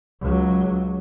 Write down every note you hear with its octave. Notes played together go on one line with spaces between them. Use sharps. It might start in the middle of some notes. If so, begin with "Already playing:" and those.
C#2 F#3